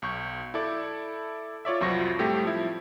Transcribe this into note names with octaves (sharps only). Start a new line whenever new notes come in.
B1 C#6 G6
E4 A4 D5
F4 C#5 D5 E5
C2 F2 F3 F#3 C#6 A#6
A2 G3 A3 C4 G4
F3 E4